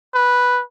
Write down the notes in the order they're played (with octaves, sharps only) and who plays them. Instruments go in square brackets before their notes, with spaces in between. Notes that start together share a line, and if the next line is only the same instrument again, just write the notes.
[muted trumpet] B4